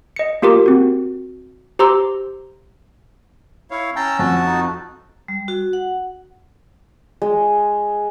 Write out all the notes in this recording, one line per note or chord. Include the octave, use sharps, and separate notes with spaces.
D#5 C#7
A#3 F4 G4 A#4 D6
C4 F#4
G4 C5 A#5 C6 D6 E6
E4 C#5 F5
C#4 G5 A5 A#5 E6
F2 F#4 A5
D#4
G3
F#4
F#5
G#3